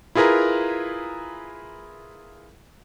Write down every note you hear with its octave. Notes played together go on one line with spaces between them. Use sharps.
E4 F4 G#4 A#4 B4 A#5